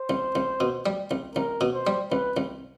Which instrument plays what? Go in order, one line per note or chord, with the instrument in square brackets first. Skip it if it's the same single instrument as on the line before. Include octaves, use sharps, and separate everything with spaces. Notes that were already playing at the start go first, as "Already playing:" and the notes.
Already playing: [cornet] C5
[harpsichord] C2
C2
B2
G3
C2
[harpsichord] C2 [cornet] A#4
[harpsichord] B2
[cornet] C5
[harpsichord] G3
[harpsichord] C2 [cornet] B4
[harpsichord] C2